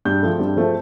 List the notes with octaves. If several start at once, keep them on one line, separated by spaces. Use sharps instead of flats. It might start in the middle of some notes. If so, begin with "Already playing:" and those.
G2 G6
F3 A3 C4
G2
F3 A3 C4